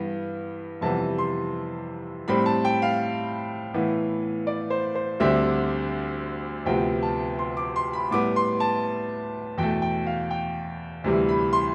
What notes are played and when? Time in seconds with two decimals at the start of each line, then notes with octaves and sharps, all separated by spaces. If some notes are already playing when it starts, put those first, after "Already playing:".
Already playing: G2 E3 B3
0.81 F2 C3 E3 G3 B3 A5
1.18 C6
2.28 A2 G3 C4 B5
2.46 A5
2.65 G5
2.82 F5
3.74 A2 E3 B3
4.47 D5
4.70 C5
4.95 C5
5.20 D2 D3 G3 C4 E5
6.65 D2 C3 F3 B3 G5
7.03 A5
7.39 C6
7.57 D6
7.76 C6
7.93 B5
8.11 A2 G3 B3 D6
8.36 C6
8.60 A5
9.58 E2 B2 A3 G5
9.82 G5
10.06 F5
10.30 G5
11.04 D2 C3 E3 G3
11.29 B5
11.53 C6